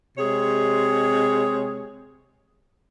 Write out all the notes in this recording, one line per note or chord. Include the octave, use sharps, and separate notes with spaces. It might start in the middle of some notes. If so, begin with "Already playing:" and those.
C3 G#3 G#4 C#5